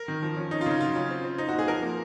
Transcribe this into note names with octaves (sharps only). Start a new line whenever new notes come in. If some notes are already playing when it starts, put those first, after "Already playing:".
Already playing: A#4
D#3
F3
C#4
C#4 D#4
F4
C#3 D#4
F#3 F4
C#4
C4
C4
C4 D#4
F#4
A#2
G#4
F3 A#4
A#3